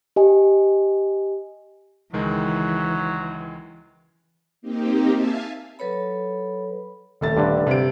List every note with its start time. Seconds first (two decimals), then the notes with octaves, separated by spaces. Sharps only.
0.16 G4 D#5 G#5
2.14 C#2 D#3 E3 F#3 G#3
4.62 A#3 C4 D#4 G4
5.11 E5 F5 G#5 A5
5.79 F#3 A4 B4 C#5 B5
7.21 D#1 A3 A6
7.37 G2 D3
7.67 C3 D7